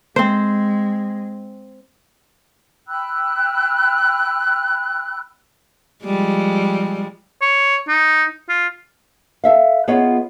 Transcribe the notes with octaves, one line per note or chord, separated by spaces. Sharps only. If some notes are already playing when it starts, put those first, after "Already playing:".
G#3 C4 C5
G5 B5 E6 F#6
F3 G3 G#3
C#5
D#4
F4
A4 E5 F5
B3 F4 G#4 C#5 D#5